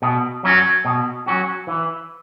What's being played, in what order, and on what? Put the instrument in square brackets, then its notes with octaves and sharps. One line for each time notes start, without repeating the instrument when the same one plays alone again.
[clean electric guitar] B2
F#3 C#4 F#4
B2
F#3 C#4 F#4
E3